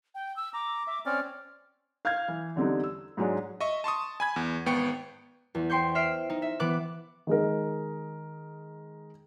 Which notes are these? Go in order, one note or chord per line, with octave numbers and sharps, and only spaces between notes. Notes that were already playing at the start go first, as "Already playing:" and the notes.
G5
E6
A#5 D6
E5
C4 C#4 D5 F6
F5 F6 G6 G#6
E3
E2 D3 G3 C4 D4 D#4
E6
G#2 F#3 G#3 D4
D#5 E5 C#6
A5 C6 C#6 D#6
G#5 B5 G#6
E2
G#1 B3 G5 C#6 C#7
E2
C5 G5 C6 C#6 G6
E5 F6 C7 D7
D#4
E5
E3 B3 D6 F#6
D#3 G#3 A#4